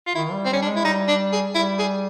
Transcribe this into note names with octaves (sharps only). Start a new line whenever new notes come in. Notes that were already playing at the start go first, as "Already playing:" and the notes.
F4
D#3 E4
G3
C4
G3 C#4
D4
G#3
E4
G3 D#4
D4
G#4
G3 E4
G#4